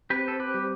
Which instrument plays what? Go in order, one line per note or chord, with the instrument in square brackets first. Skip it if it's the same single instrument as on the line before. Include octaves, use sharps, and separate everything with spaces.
[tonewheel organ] C4 [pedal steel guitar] G4 B4
[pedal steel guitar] A4
G4 B4
[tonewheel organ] G3